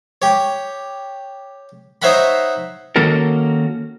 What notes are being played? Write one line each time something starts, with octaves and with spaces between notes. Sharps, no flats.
G4 C#5
D#4 C5 C#5 E5 F#5 B5
D#3 A#3 C#4 F#4 A4 A#4